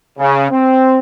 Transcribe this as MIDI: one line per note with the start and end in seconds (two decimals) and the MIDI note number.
0.19 0.49 49
0.51 0.98 60